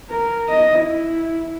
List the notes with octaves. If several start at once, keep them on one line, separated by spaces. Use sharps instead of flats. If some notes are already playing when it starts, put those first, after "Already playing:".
A#4
D#5
E4